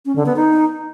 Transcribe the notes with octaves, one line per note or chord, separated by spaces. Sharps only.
C#4
D3
B3
D#4